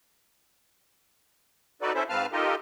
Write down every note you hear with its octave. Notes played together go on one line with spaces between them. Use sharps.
D#4 F#4 A4 B4 D5
C#4 E4 A4 C5 E5
G#2 C4 B4 F5 A5 F6
D#4 F4 G4 A4 A#4 D#5